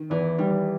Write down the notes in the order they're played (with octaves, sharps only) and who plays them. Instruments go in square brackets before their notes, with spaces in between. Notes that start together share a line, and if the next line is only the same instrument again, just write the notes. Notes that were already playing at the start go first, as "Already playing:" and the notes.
Already playing: [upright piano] D#3
[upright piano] E2 [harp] E3
[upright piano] D#3 [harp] G3